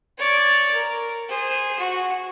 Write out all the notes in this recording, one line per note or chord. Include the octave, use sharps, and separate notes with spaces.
C#5 D5
A#4
G#4 C5
F#4